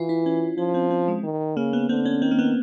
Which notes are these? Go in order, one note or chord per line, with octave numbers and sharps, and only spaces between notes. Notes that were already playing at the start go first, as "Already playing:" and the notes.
Already playing: E3 F4
E4
C#4
F3 C#4
C4
C4
G#3
D#3
C#3 A#3
B3
D3 C4
C#4
D#3 C4
A#3
B3